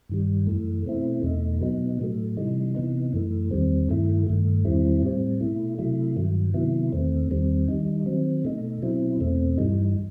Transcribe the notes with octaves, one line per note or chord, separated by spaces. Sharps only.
G2 D#3 G3
F#2 E3 A3
B2 A3 C4 E4
E2 B2 A3 D#4
B2 F#3 B3 D#4
A2 F#3 A3
C3 E3 G3 D#4
C3 E3 B3 D#4
F#2 E3 A3
E2 D#3 G3 C4
G2 D#3 A3 E4
G2 D#3 A3
E2 D#3 G3 C4 E4
A2 G3 C4
B2 A3 E4
C3 F#3 A3 E4
G2 D#3 F#3
C3 D#3 F#3 B3 E4
E2 D#3 A3 C4
E2 D#3 G3 C4
D#3 G3 D#4
D#3 F#3 C4
B2 A3 D#4
B2 F#3 C4 E4
E2 B2 A3 C4
G2 E3 G3 D#4